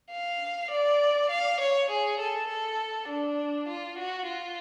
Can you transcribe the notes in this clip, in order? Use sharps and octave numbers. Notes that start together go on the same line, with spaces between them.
F5
D5
F5
C#5
G#4
A4
A4
D4
F4
F#4
F4